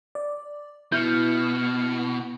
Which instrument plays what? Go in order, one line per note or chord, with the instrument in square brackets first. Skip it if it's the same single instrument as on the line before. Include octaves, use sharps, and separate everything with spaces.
[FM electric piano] D5
[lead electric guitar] B2 [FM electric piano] E4 F6 C#7 [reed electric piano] G6